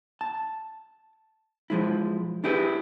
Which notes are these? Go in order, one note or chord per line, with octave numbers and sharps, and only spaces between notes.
A5
B1 F3 G#3 E4
D4 E4 G4 G#4 B4